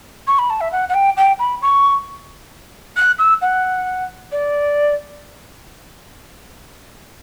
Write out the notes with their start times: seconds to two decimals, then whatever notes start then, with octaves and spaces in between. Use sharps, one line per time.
0.27 C#6
0.38 B5
0.50 A5
0.61 E5
0.72 F#5
0.89 F#5
0.94 G5
1.17 G5
1.39 B5
1.62 C#6
2.96 F#6
3.18 E6
3.42 F#5
4.32 D5